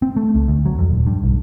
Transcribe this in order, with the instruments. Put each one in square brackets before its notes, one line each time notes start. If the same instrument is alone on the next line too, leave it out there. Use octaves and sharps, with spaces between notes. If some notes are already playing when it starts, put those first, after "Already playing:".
[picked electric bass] C4
A3
C#2
D2
F#3
F2
D#1
G2
B1